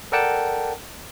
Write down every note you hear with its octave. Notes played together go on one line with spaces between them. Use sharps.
A4 A#4 D5 F#5 G5 A5